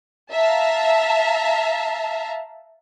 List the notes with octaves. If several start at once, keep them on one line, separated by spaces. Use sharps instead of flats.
E5 F5 A5 A#5